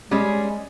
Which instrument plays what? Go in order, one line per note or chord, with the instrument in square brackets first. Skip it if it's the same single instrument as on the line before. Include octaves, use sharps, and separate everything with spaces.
[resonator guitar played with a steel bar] G3 C#4 G#4 [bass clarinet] G#3